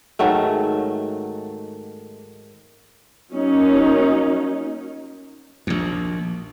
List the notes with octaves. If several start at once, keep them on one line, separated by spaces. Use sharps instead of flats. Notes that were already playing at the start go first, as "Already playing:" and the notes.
G#2 D#3 F#3 A3
F#3 A#3 C#4 D#4
A#1 D#2